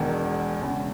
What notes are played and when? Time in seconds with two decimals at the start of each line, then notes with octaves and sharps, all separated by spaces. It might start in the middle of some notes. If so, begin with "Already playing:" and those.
Already playing: E1 E2 D#3
0.61 E1 E2 C#3